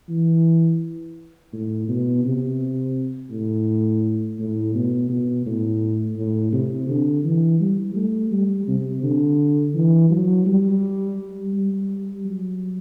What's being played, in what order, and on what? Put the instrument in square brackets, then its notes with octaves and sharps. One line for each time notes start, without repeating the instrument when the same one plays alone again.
[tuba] E3
A2
B2
C3
A2
A2
B2
B2
A2
A2
C3
D3
E3
G3
A3
G3
C3
D3
E3
F#3
G3
G3
F#3